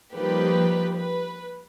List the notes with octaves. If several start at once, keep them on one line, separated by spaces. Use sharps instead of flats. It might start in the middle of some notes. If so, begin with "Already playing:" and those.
F3 G3 A#3 D#4 G4 B4
B4